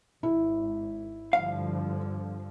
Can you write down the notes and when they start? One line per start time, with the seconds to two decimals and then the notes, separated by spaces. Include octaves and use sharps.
0.23 G#1 E4
1.33 G2 D3 F3 F5